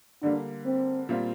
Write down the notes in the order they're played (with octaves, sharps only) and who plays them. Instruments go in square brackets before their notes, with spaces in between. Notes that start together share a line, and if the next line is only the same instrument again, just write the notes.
[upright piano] D3 G3 A#3 [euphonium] D4
[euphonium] C4
[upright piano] A#2 G3 C4 F4